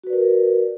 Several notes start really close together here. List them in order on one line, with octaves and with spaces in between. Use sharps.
F#4 B4 D5 A#4